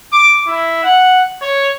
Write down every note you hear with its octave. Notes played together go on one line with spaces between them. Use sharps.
D6
E4
F#5
C#5